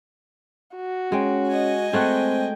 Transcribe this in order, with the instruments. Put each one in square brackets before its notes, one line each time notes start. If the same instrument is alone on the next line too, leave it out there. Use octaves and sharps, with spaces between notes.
[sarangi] F#4
[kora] G#3 G5 [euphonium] C#4
[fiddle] D#5 G#5
[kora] G#3 A3 F#5 [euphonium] C4 [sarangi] G5